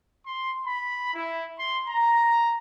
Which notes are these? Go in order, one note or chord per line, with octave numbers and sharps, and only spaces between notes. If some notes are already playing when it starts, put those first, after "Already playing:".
C6
B5
E4
C6
A#5